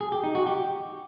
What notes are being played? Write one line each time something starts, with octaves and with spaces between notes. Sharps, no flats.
G#4
G4
D#4
F#4
G4